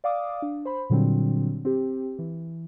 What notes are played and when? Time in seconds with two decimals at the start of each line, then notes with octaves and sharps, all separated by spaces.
0.04 D5 F5 D6 D#6
0.42 D4
0.65 C5 B5
0.90 A#2 D3 F#3 G3 C4 D4
1.65 C4 G4
2.19 E3